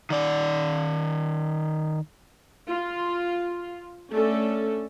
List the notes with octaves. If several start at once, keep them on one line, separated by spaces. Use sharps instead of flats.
D#3 D5
F4
A3 C#4 D4 A4